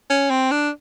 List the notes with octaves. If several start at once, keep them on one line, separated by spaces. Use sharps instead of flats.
C#4
C4
D4